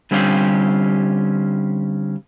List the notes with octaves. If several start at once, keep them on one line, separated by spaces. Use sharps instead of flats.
D3 G3 C4 C#4 F4 G4